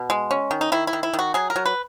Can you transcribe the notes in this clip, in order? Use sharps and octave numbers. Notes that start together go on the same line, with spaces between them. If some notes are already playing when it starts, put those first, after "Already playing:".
Already playing: B2
G#3
C#4
D#3
D#4
D#3 E4
E4
D#3
E4
D#3
F#4
F#3 G#4
A#4
F#3
B4